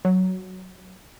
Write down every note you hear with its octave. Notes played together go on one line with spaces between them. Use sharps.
F#3